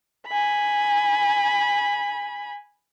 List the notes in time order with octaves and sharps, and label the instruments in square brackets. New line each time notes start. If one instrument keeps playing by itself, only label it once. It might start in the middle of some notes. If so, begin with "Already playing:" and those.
[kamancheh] G#5 B5